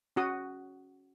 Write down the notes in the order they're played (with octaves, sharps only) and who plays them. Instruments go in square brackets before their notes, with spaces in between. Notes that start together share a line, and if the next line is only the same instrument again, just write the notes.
[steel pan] C#4 F#4 D#6